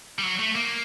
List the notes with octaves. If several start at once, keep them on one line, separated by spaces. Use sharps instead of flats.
G3
F#3
A3
A#3